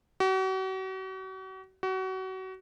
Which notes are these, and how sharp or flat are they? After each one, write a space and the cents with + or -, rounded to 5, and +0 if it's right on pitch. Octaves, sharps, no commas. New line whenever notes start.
F#4 +40
F#4 +30